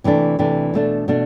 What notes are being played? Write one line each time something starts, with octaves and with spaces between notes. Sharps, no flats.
C3 E3 A3 D4
C3 E3 A3 D4
B2 A3 D4
B2 A3 D4